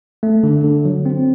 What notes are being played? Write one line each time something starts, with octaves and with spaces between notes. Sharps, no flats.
A3
D3
D3
F#3
C4